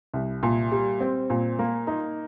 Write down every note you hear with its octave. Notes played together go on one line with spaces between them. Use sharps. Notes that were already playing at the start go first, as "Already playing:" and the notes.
C2
A#2
G3
C4
A#2
A#3
D#4